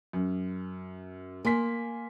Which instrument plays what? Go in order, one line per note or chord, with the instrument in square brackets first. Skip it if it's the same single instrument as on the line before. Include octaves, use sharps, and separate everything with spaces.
[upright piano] F#2
[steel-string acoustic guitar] A#3 [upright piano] G#5 C6 B6